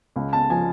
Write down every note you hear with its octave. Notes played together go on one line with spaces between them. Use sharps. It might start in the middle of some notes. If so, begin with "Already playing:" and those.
C#2
A5
F3 G#5